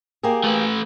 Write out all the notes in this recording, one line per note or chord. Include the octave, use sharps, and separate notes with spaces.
A#3 G4 G#4
A3 B4